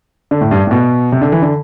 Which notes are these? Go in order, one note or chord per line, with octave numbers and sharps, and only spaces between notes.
D3
A2
G2
A2
B2
C3
D3
E3
D3